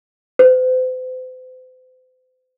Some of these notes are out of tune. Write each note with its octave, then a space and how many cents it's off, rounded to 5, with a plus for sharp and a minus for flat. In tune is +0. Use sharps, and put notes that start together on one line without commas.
C5 -40